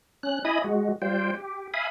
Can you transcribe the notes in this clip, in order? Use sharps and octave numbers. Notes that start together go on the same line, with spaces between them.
C#4 F#6
E4 D#5 G#5 B5 D#6
G#3 F#4
G3 F4 C5 G5
G4
E5 F5 G#5 B5 D#6